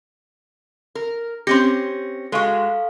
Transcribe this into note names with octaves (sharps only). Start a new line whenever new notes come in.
A#4
C4 C#4 G4 A#6 C#7
G#3 F#4 A4 F5 C#6